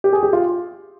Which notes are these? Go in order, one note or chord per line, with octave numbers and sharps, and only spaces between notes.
G4
G#4
G4
F4